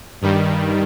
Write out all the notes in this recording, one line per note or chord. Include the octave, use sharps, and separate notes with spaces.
G2 D#3 G3